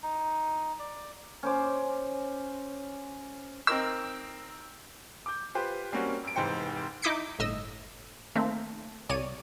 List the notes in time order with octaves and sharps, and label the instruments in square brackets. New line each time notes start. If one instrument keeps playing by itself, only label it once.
[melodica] D#4
D5
[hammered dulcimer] C#4 C5 D6
[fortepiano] C4 D#4 A#4 E6
[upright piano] D6 G6
F4 G4 B4 C5
G3 A#3 C4 C#4 F#4
F#2 D7
F1 G#2 E3 C5 G5 C#7
[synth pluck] D#4 E4 D6 G6 B6 C#7
G1 A2 D#5 E6
D#3 A3 A#3 C4
C2 C#5 D5 D#7